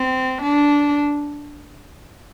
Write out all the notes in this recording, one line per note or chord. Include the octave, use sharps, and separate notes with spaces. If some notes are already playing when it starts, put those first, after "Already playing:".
Already playing: C4
D4